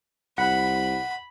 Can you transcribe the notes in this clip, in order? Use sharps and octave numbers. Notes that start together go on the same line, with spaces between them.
C2 F#5 B5